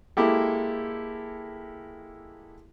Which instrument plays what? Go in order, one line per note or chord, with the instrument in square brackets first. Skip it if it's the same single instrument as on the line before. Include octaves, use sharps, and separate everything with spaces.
[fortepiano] G#3 A#3 E4 G4 A4